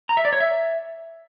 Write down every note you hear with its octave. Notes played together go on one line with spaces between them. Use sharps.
A#5
E5
D5
C#5
E5